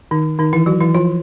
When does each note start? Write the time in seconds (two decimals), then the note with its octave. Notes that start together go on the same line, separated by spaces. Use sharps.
0.11 D#3 D#4
0.39 D#3 D#4
0.53 E3 E4
0.66 F#3 F#4
0.80 E3 E4
0.95 F3 F4